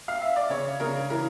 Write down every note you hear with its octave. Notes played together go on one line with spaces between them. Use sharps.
F5
E5
D5
C#3 C#5
C#3 A#4
E3 A#4